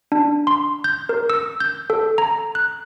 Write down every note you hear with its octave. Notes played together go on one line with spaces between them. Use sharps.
D4
C6
G6
A#4
E6
G6
A4
A#5
F#6